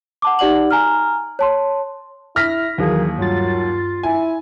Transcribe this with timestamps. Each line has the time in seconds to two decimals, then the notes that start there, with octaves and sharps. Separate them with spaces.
0.22 F#5 A5 D6
0.39 D#4 G4 D5 F#5 F#7
0.71 G#5 A#5 F6
1.39 C#5 A5 C6
2.36 E4 F6 A#6 B6
2.78 D#2 E3 F#3 A#3 G#4
3.18 G2 F#3 F4 A6
4.03 E4 G#5